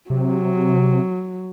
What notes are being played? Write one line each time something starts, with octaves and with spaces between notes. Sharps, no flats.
C3 F#3